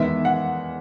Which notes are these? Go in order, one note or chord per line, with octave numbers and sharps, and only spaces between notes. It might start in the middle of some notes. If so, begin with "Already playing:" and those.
Already playing: E2 D#3 G#3 B3 E5
F#5